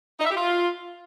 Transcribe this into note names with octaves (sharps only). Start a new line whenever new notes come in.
D#4
E5
G4
F4